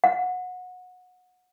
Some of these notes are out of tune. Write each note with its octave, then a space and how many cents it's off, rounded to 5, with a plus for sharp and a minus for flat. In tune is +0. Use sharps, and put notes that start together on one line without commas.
F#5 -25